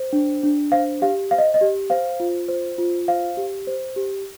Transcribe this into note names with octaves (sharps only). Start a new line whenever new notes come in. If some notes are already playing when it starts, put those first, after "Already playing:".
Already playing: C5
D4
D4
C5 F5
G4 F5
C5 F5
D#5
D#5
G4
C5 F5
F4
C5
F4
C5 F5
G4
C5
G4